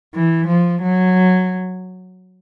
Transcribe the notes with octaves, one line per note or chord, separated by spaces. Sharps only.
E3
F3
F#3